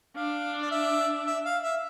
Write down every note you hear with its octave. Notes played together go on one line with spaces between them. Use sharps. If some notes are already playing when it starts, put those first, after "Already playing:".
D4 F5
D5
E5
E5
F5
E5